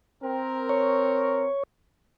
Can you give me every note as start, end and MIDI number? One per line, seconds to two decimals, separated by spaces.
0.22 1.47 60
0.22 1.47 70
0.69 1.63 73